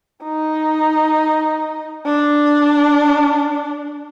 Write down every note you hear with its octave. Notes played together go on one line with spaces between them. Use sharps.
D#4
D4